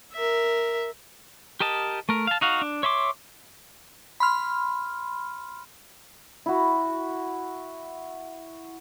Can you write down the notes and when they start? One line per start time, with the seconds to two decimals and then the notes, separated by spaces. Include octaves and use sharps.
0.14 A#4 E5
1.60 G4 A#4 D#5 A5
2.09 A3 A#4
2.27 F5 A5
2.41 D#4 F#4 F5
2.62 D4
2.83 C#5 E5 C6 D6
4.20 B5 C6 F6
6.46 E4 F#4